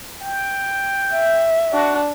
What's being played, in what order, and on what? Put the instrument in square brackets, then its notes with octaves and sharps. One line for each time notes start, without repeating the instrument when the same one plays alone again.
[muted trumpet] G5
[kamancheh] E5
[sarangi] D4 [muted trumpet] F#4